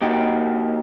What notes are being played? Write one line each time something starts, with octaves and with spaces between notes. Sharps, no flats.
A#3 D#4 F#4 G4